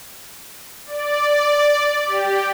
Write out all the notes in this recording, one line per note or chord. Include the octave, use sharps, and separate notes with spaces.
D5
G4